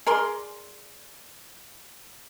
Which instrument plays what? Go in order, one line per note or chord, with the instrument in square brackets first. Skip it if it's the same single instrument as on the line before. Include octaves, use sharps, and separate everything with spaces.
[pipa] G#4 A#4 D5 C6